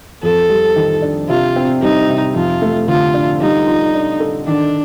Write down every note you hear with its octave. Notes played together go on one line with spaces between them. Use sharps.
F2 A4
G3
D#3
D4
C3 F4
C4
G3 D#4
C3
F2 F4
A3
D3 F4
D4
G3 D#4
F4
D4
A4
D#3 D4